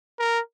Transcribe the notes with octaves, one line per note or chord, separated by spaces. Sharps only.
A#4